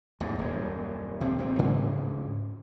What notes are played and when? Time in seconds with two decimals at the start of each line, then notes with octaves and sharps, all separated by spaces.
0.20 A1 E2 G#2
0.39 D#1 F#2
1.20 D2 C3 C4
1.38 G#1 A#2 C4
1.59 D2 G#2 C#3